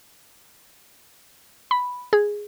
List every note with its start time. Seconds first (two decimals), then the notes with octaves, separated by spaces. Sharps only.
1.71 B5
2.13 G#4